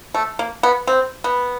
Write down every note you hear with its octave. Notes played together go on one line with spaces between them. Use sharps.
A3
A#3
B3
C4
B3